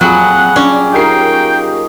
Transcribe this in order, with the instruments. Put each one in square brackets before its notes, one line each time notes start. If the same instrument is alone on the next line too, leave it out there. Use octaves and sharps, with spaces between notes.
[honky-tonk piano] F2 F#7 [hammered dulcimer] A#2 G3 G#4 [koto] F#3 [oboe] F#5
[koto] C#4 [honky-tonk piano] D4
[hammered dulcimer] D#4 F4 C#5 [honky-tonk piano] G4 A#4 C7 [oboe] G5